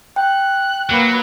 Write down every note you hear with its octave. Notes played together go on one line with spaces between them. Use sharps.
G5 F#6
F#3 A#3 B4